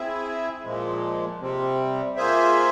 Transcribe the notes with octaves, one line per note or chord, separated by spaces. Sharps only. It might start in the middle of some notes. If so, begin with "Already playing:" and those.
Already playing: C4 E4 G#4 E5
A#2 F3 G#3
C3 G3 C4
A#3 F4 G#4 C5 E5